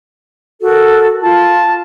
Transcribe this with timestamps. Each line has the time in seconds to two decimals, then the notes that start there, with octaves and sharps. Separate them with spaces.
0.61 F#4 A4 A#4
1.22 F4 A5